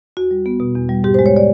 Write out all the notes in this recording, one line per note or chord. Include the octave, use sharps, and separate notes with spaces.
E2 F#4
G3
B3
B2
E2
G3
G#2 G4
C5
G#3
C#5
D5